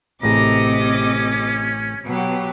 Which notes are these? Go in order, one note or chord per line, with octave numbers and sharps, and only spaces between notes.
A1 A2 C3 G#4 D#5 A#5 D6
C#4
B2 F#3 G4